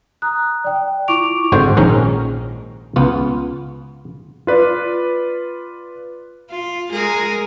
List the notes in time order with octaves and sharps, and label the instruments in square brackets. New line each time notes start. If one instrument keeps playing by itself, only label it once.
[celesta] A#5 D#6 F#6
D5 G5
E4 F4 C#6 D6 D7 F7
[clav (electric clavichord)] G#1 G#2 D3 F#4 C5 F#5
A#1 G#2 D#3 C#4 A#4 A#5
C#2 B3 F4
[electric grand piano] F4 B4 D5
[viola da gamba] F4
G#3 G#4 A#4